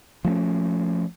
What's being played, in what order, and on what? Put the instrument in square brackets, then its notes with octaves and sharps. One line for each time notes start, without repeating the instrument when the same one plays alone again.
[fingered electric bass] F3 A3 B3 C#4